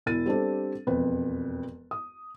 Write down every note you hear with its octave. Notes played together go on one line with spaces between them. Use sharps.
E1 E4 A6 D#7
G3 C4 D4 A4
E1 F2 B4
D#6